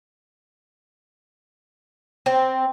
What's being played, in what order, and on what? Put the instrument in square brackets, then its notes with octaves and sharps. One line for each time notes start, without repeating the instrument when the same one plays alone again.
[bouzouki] C4